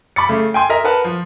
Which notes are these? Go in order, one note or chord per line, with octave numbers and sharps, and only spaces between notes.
B5 C#6 D6 A6 C#7
C#3 A3
G5 G#5 C6
A#4 D#5 E5 A#5
A#4 B4 F#5 A5
F3